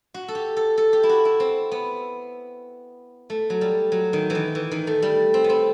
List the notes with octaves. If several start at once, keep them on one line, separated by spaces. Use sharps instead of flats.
F#4
A4
G4
A4
A4
G4
E4
F#4
E4
C4
B3
A3
F#3
G3
F#3
D#3
E3
D#3
E3
D#3
A3
G3
C4
B3
C4